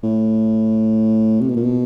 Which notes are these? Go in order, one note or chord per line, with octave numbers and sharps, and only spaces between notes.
A2
C3
B2
A#2
B2